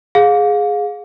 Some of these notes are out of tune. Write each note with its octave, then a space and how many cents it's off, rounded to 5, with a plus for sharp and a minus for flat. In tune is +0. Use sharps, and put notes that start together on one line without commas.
G#4 +0 F5 +30